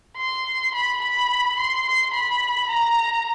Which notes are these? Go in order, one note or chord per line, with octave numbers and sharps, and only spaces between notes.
C6
B5
B5
C6
C6
B5
A#5